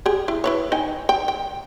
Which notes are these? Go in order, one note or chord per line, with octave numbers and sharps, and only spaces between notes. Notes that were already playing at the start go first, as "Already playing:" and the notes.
G4 G#4
E4
E4 B4 C#5
D#4 G5 G#5
G5
G5